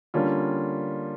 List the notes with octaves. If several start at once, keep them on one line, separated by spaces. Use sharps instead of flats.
D3 G3 A#3 C#4 F4